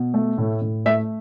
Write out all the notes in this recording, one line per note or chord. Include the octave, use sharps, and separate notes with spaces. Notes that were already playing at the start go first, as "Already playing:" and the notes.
Already playing: B2
A3
A2
A2
A3 E5